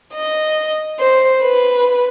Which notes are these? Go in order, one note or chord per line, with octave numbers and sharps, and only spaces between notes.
D#5
C5
B4